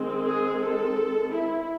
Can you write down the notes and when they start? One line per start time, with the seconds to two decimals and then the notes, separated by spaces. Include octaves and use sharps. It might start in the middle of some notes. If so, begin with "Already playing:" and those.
Already playing: D#3 G#3 C4
0.24 G#4
0.61 A4
1.32 E4